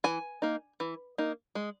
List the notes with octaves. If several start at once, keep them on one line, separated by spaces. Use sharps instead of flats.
E3 G#5
A#3 D#4
E3
A#3 D#4
G#3